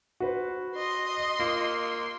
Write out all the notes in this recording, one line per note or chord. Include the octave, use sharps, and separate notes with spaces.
F#4 B4 C5
D#5 C6
A#3 F4